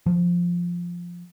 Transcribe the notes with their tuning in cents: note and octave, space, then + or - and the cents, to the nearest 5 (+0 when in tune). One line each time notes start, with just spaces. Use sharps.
F3 +0